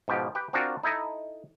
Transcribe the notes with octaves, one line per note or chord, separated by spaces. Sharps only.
G#2 B2 F3 G4
G4 B4 G5
C4 D4 F4 F#4 A#4
D#4 E4 A4 D#5